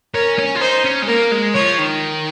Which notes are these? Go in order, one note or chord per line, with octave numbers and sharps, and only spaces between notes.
C#4 A#4
C#4
F4
D#4 C5
C#4
G#3
A#3 A#4
G#3
F3 C#5
D#3